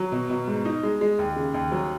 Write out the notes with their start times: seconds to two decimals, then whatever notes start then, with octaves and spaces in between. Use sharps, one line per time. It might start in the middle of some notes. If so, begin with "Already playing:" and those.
Already playing: F#3
0.12 B2
0.30 B2
0.47 G#2
0.65 D#4
0.83 G#3
1.01 G#3
1.19 D#2
1.36 C#3
1.54 D#2
1.72 F#3